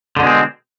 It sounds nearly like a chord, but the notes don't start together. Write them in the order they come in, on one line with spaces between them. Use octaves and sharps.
D3 B2 G#3 C4